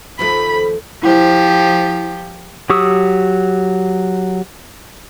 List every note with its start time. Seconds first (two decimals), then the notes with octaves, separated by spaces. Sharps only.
0.19 D#2 F3 A3 B5
1.03 F3 E4 G4 C5
2.70 F#3 G4 C#6 D#6 E6